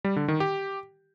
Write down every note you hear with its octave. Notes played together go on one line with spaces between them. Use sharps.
G3
D3
D#3
G4